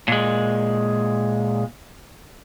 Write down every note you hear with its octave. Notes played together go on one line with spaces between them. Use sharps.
A#2 G#3